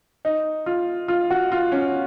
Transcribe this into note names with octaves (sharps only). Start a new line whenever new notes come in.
D#4
F4
F4
F#4
F4
C#4